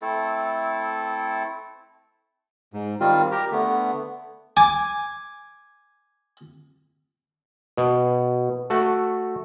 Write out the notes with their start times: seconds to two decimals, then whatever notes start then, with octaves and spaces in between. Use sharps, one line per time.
0.02 A3 C4 E4 A4
2.73 G#2
3.00 D#3 G3 C4 F4
3.31 G4 A#4
3.52 D3 A3 B3
4.57 G#5 D6
7.77 B2
8.70 A3 F#4